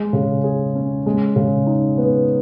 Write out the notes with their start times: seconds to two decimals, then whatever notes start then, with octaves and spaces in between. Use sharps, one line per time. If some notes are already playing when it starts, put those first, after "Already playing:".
Already playing: G#3
0.13 C#3
0.44 G#4
0.75 C#4
1.06 G#3
1.36 C#3
1.67 D#4
1.98 B3